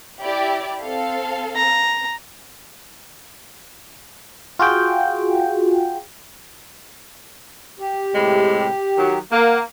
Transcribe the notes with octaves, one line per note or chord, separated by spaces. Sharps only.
E4 G4 D5
C4 A4 F5
A#5
F4 F#4 G#4 G5
G4
A2 C3 G#3
D#3 F#3
A#3 F#5